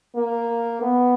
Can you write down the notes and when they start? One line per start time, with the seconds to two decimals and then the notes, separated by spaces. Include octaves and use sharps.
0.15 A#3
0.82 B3